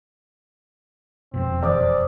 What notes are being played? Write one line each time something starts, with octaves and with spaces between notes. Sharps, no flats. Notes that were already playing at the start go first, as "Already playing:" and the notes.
E1 F2 B2 C4
E2 C5 D5 D6 D#6